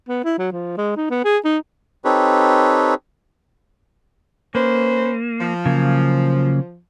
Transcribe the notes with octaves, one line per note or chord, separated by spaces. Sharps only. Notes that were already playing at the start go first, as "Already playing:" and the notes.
B3
E4
F#3
F3
G#3
D#4
B3
G#4
D#4
C4 D#4 G4 A4 B4 C#5
A#3 C#4 B4 C5
F3
C#3 F#3 A#3